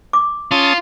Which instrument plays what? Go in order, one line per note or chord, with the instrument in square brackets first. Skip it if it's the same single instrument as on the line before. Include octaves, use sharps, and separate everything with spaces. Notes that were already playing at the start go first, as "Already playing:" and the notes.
[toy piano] D6
[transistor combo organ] C#4 A5 D#6 [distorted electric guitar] F4